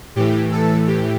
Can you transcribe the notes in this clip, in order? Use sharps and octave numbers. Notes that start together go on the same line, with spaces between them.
A2 E3 G4
A4
G4